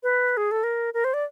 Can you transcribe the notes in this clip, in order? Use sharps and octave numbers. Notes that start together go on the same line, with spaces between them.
B4
G#4
A4
A#4
A#4
C5
D5